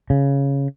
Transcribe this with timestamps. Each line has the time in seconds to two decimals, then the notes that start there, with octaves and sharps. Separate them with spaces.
0.10 C#3